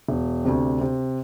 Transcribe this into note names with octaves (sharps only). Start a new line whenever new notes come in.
E1
D2 C3
C3